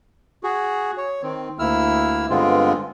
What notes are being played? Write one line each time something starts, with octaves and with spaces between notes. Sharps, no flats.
F#4 G#4
C#5
D#3 C4
D2 A#3 E4 E6 F6
G2 D3 G#3 B3 C4 F4